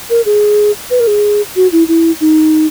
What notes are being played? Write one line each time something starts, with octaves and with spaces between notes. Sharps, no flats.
A#4
G#4
B4
A#4
G#4
F#4
E4
E4
D#4